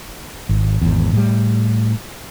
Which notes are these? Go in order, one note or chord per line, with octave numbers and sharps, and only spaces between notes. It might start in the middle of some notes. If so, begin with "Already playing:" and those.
G#1
G#1 E2
A2 G3